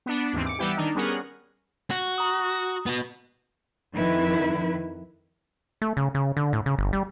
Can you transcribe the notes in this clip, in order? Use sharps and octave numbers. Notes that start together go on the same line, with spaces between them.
B3 D4
D#2 G#2 E3 C4
D6 C#7
E3 G3 B3 E4 G4
D#3 D4 D#4
G3 B3 C#4 G#4 A#4 F#5
F#4
A#5 D#6
B3 F#4
F2 D#3 E4 B4
A3
C#3
C#3
D3
A2
C#3
G1
G3